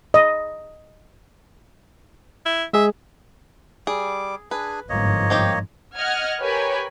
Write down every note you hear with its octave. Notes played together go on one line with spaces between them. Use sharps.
D#5
E4
G#3 G#4 E5
G3 G#4 D6
D4 G#4 B4 G#5
G1 G#2 F3 A#3 C#5 D#5
C4 D#4 G4
D#5 F#5 F6 G#6
G4 A#4 B4 C#5 G#5 B5